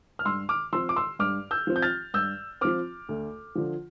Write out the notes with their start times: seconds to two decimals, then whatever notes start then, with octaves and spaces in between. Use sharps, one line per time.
0.19 F6
0.25 G2 C6 E6
0.49 D6 F6
0.73 F3 C4 C6 E6
0.89 D6
0.96 C6 E6
1.19 G2 D6 F6
1.51 E6 G6
1.67 F3 C4
1.76 G6
1.82 F6 A6
2.14 G2 E6 G6
2.61 F3 C4 D6 F6
3.09 D2
3.55 D3 F3